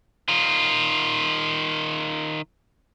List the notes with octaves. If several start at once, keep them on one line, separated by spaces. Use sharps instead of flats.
D#3 F4